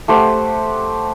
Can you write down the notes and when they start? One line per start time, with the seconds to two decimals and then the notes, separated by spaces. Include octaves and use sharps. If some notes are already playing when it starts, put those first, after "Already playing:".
0.08 A3 G4 C5 F#5